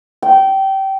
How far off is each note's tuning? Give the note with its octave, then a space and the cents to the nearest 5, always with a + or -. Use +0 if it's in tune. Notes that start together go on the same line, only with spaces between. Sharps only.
G5 -20